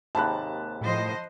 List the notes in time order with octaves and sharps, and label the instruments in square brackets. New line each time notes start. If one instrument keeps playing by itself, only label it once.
[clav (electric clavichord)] D#2 G#2 C3 [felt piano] A5 B5 F#6
[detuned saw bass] A2 [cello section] F3 C5 D#5